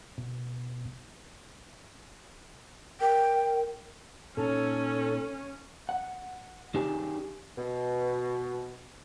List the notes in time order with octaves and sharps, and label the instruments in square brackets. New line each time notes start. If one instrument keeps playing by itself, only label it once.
[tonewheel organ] B2
[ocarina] A#4 [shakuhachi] G5
[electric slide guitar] A#2 D#4 C#5 [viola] C#4 [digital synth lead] A4
[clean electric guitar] F#5
D#3 D4 G4 G#4
[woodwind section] B2